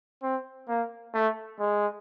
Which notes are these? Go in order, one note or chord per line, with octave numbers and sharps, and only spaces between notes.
C4
A#3
A3
G#3